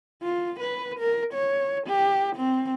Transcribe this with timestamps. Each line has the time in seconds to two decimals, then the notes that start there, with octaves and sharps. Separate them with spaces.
0.23 F4
0.60 B4
0.99 A#4
1.34 C#5
1.87 G4
2.36 C4